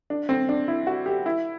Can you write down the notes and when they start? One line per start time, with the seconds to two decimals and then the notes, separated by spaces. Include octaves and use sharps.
0.10 D4
0.29 C4
0.49 D4
0.68 E4
0.87 F#4
1.06 G4
1.26 E4